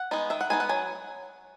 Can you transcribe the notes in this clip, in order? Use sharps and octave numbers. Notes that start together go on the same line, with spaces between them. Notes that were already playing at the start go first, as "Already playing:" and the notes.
Already playing: F#5
G#3 B3 D#4
D#3 E5
F#5
G#3 B3 D#4 G#5
F#5
F#3 G#5